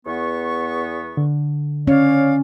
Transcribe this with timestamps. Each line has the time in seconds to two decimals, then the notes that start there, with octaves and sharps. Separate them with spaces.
0.06 E2 B3 C#6
1.17 D3
1.87 C#4 C#5 D5 F5